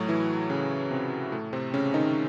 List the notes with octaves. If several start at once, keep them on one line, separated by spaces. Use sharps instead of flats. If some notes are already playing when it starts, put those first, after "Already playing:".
Already playing: A2 F#3 A3 F#4
E3 E4
C#3 C#4
C3 C4
A2 A3
C3 C4
C#3 C#4
D#3 D#4